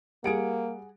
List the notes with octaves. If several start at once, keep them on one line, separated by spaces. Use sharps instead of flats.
G3 A#3 G#4 F#5 D7